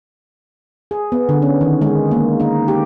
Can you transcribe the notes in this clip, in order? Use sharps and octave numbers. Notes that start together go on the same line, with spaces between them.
G#4
B3
D3
C#4
D#3
G#3
A#3
D#4
G4